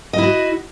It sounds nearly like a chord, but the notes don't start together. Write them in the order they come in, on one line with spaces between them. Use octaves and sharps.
D#5 E4 F#4